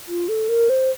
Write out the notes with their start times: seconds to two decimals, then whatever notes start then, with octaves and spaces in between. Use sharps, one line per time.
0.08 F4
0.29 A4
0.49 A#4
0.69 C5